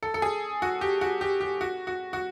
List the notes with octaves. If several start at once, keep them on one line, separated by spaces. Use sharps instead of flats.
A4
A4
G#4
F#4
G4
F#4
G4
G4
F#4
F#4
F#4